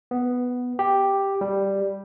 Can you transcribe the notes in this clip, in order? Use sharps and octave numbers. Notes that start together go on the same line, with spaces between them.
B3
G4
G3